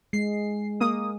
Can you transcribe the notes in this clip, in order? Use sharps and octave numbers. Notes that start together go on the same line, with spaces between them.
G#3 C7
A#3 D#6